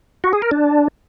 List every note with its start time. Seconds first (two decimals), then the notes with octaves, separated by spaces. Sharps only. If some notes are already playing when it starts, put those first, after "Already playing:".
0.24 F#4
0.33 G#4
0.42 A#4
0.51 D4